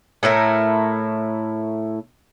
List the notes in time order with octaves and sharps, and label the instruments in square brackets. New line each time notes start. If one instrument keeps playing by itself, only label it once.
[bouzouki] A2 A3 E4 A#4